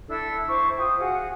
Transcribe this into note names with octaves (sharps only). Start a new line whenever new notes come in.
D4 E4 A4 E6
E4 C5 C#6 D6
F4 C5 G5 D#6
F#4 G#4 F5 F#5